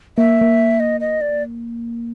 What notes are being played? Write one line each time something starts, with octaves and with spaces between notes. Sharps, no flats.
A#3 E5
A#3
D#5
D#5
D5